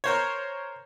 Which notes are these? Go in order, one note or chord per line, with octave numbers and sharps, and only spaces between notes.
A#4 C5 C#5